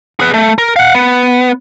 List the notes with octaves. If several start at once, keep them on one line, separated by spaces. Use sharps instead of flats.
G#4 B4
A3
A#4
F5 F#5
B3